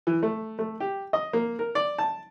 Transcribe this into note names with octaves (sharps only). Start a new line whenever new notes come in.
E3
A3
A3
G4
D#5
A#3
A#4
D5
A5